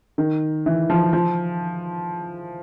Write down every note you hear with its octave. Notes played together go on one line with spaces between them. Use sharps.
D#3
E3
F3
F3